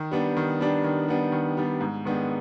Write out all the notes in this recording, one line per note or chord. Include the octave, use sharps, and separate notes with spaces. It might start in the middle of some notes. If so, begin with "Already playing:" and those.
Already playing: D#3
G3 B3 D4
D#3
G3 B3 D4
D#3
G3 B3 D4
D#3
G3 B3 D4
G#2
D#3 G#3 B3 D4